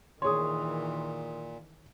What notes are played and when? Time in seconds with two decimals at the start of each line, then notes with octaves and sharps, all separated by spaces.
0.22 A#2 D#3 E3 G#4 C#5 C6 D#6